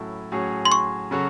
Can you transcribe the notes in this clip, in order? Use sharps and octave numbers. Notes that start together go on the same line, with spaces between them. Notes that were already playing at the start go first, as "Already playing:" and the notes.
Already playing: A2 F#3 C#4 E4 A4
A2 F#3 C#4 G#4
C6
C#6
C#3 F#3 C#4 F#4 A4